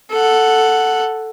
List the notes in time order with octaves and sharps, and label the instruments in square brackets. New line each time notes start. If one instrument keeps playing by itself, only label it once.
[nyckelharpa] A4 F#5